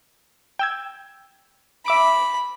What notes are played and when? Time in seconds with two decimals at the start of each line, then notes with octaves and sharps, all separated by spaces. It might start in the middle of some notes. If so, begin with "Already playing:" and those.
0.59 G5 E6 G#6
1.86 E5 B5 D6 D7